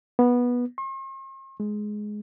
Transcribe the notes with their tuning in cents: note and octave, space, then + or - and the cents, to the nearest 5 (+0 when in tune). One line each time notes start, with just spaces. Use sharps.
B3 -15
C6 +45
G#3 +10